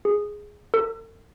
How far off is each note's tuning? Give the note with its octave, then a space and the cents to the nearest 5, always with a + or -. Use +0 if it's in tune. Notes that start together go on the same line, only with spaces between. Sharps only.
G#4 +0
A4 +45